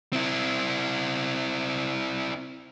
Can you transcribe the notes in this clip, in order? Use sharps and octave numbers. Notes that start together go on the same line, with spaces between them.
C4 E4